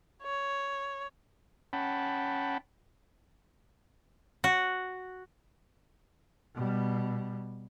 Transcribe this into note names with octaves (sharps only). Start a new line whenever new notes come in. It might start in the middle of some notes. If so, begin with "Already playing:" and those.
C#5
C#4 F#5 G5 A5 B5
F#4
B2 G3